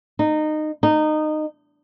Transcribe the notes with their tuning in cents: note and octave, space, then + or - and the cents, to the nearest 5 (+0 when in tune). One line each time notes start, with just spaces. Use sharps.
D#4 -20
D#4 -20